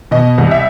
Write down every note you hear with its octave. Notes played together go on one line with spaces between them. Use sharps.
B2 D#5
C2
E5